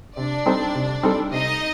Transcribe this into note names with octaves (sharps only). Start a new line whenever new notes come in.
C3 D4 D5
G3 C4 D#4 A4
C3
G3 C4 D#4 A4
C3 D#4 D#5